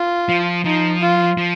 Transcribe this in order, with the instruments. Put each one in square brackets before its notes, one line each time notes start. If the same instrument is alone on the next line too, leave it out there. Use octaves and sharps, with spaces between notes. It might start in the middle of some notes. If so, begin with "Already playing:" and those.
Already playing: [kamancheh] F4
[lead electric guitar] F3
[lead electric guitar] F3 [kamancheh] D#4
[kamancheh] F4
[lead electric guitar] F3